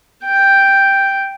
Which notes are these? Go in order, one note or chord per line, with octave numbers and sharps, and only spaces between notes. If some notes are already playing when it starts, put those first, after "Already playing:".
G5